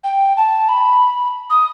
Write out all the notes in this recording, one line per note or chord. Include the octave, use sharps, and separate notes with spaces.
G5
A5
B5
D#6